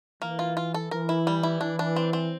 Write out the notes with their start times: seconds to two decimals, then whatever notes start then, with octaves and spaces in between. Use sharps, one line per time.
0.22 E3 A#3
0.39 F4
0.57 F4
0.74 A4
0.91 E3 A#4
1.09 E4
1.27 G3
1.43 E4
1.61 E3 D4
1.79 D4
1.96 C4
2.13 C4